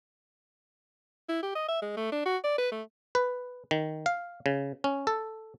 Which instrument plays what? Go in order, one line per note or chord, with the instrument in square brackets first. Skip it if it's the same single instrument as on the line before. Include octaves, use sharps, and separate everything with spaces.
[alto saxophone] E4
G4
D#5
E5
G#3
A3
D4
F#4
D5
B4
A3
[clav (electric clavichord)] B4
D#3
F5
C#3
C#4
A4